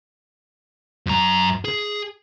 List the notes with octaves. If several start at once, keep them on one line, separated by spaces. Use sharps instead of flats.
F#2 A#5
G#4